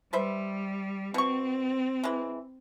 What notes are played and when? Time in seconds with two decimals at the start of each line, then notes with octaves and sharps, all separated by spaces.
0.13 G3 B4 C5 E5
1.14 B2 C4 C#6
2.03 E3 G#3